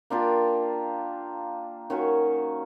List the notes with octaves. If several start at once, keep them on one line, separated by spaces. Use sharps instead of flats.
A#3 D4 F4 G4
D#3 C#4 F#4 C#5